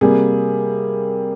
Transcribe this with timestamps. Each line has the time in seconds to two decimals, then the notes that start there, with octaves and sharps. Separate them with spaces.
0.01 C3 G3 A#3 G#4